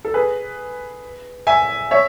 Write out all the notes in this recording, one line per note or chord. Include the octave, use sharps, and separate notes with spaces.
A4
G#4 B4
E5 G#5
C#5 E5